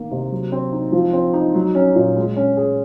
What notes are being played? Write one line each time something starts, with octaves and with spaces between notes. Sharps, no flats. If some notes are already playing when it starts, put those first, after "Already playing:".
Already playing: D#3 A#3
C3
F#3
C4
D#4
F3
C4
D#4
F#3
C#4
A#2
G#3
C#4
G#4